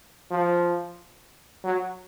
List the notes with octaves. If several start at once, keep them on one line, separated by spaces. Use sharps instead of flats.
F3
F#3